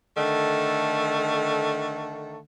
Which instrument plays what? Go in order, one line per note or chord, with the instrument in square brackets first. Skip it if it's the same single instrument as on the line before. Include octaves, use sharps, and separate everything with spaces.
[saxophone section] D3 D#3 A3